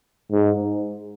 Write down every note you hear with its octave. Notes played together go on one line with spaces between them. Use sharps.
G#2